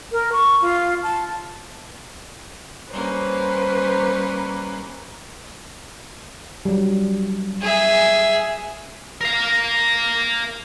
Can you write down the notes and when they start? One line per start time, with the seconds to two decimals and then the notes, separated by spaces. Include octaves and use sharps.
0.12 A#4
0.32 C#6
0.62 F4
1.03 A5
2.92 G3 A#3 C#4 B4 C5
6.65 F#3 G3
7.61 G#4 E5
9.21 A#4 F5